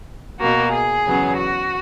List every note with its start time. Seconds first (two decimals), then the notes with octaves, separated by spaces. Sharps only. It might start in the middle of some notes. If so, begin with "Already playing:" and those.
0.40 B2 A#3 F#4
0.72 G#4
1.04 E2 C#3 F#3 B3
1.36 F#4